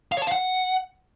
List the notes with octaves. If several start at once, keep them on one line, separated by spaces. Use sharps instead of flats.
F5
C#5
A5
F5
F#5